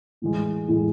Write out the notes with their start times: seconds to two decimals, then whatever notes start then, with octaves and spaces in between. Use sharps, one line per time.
0.22 A2 E3 G#3
0.68 A2 E3 G#3